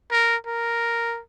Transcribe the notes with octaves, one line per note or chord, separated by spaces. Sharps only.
A#4
A#4